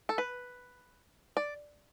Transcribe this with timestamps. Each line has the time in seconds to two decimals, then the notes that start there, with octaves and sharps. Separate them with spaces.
0.09 A4
0.18 B4
1.37 D5